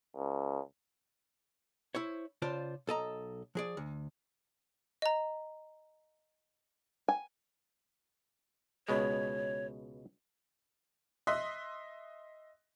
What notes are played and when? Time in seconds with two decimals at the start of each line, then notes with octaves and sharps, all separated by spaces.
0.15 C#2
1.95 E4 C5 C#5
2.42 C#3 F4 C5 D5 A5
2.87 B1 A4 D#5 A#5
3.55 F3 G#4 D5
3.77 D2
5.02 D#5 A#5
7.08 G#5
8.89 C#2 B2 G#3 C#5
11.27 D#5 E5 C6 D#6 F#6 B6